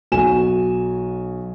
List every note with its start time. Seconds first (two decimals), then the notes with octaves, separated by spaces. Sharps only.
0.12 B1 F#4 G#5 E7